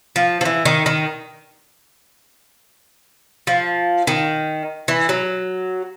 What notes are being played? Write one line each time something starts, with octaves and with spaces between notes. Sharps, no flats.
F3
F3
E3
D#3
D#3
F3
D#3
E3
F#3